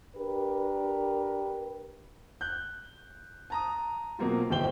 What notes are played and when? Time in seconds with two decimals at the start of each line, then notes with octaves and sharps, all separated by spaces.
0.17 D4 G4 A#4 B4
2.41 F#6 G6
3.50 A5 A#5 D#6
4.19 B2 F#3 A#3 C4 F4
4.50 D1 G1 C5 G5 G7